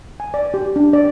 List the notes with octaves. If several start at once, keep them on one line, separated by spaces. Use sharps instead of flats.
G#5
D5
G4
D4
D5